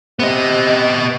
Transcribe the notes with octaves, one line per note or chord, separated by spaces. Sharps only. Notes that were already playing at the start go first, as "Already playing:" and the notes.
C3 B3 D#5